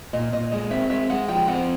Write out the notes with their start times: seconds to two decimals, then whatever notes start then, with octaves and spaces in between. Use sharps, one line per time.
0.13 A#2 D#5
0.33 A#2 D#5
0.51 G#3 D#5
0.70 C4 E5
0.90 G#3 E5
1.10 G#3 F#5
1.28 F3 G5
1.48 C4 F#5